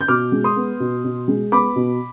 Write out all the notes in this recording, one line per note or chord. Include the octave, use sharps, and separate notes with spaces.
G6
B2 D6 F6
G#3
C6 D#6
B3
B2
B2
G#3
B3 B5 D6
B2